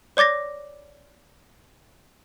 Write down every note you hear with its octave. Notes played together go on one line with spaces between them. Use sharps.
C#5 D5 D6 A6 A#6